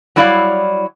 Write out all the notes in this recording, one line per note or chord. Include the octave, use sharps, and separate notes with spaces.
F#3 G3 E4 D5 F5